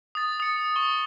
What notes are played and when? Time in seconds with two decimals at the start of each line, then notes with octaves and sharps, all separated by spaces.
0.15 D#6 A6
0.40 D#6 C#7
0.76 C#6 G7